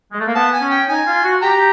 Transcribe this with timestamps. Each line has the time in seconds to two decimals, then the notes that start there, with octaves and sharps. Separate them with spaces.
0.12 G#3
0.20 A3
0.27 A#3
0.35 B3 A5
0.53 G#5
0.61 C#4
0.71 G5
0.88 D#4 G#5
1.06 F4
1.24 F#4
1.42 G4 G5 A#5